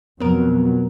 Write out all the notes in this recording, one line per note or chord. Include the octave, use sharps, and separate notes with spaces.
F2 B2 F#3 B3 A#4